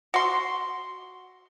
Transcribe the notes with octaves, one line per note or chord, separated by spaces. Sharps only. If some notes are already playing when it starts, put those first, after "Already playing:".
F#4 C6